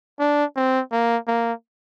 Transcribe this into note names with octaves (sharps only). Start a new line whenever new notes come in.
D4
C4
A#3
A#3